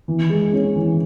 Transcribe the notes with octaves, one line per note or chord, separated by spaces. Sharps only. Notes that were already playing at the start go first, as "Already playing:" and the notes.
E3
G#3
C#4
E3